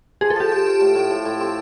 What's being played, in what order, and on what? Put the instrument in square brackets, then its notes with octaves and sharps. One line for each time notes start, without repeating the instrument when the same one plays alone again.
[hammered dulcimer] F3 [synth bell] G#4
[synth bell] A4
[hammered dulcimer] F3 [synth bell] G4
[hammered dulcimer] F3
F3
A2
A2
A2
A2
C4